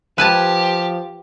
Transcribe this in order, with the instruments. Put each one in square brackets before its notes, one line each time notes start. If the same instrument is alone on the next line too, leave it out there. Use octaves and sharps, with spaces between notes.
[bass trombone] F3 [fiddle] G4 [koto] B4 G#5 A5